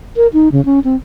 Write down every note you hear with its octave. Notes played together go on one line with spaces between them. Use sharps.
A#4
D#4
C#3
C#4
C4